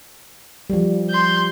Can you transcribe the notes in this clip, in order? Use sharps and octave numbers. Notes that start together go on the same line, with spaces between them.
F3 G3
C6 G6